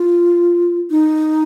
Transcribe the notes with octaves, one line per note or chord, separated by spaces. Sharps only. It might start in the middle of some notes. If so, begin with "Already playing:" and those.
Already playing: F4
D#4